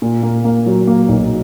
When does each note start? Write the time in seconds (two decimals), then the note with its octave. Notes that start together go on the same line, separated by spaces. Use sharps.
0.02 A#2
0.23 A#3
0.44 A#3
0.66 F#3
0.87 A#3
1.09 B1